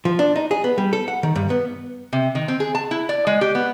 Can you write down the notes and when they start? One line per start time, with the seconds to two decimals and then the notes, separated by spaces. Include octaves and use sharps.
0.05 F3
0.19 D4
0.36 D#4
0.51 G#4
0.64 B3
0.78 G3
0.93 A4
1.08 F#5
1.23 D#3
1.35 G2
1.50 B3
2.13 C3
2.35 D#3
2.48 C4
2.60 G#4
2.75 A5
2.91 E4
3.09 D5
3.27 G#3
3.41 G4
3.55 B3